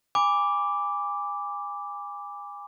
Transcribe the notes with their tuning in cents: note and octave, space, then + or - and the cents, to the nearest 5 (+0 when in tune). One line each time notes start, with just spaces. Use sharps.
G#5 -30 B5 +0 D6 -5